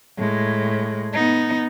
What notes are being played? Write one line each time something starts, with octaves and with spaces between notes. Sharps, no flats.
A2 G#3
B3 D#4